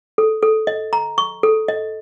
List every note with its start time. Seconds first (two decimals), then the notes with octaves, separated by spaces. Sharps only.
0.18 A4
0.42 A4
0.67 D#5
0.93 A#5
1.18 C#6
1.43 A4
1.68 D#5